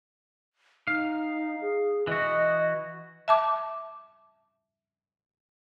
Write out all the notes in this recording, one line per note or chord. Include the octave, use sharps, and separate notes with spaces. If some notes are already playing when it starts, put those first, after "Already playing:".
D#4 F5
G#4
E3 F#4 D#5
E5 A5 D6